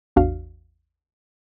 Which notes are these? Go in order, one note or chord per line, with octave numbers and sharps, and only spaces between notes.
A1 E2 D4 F#4 F5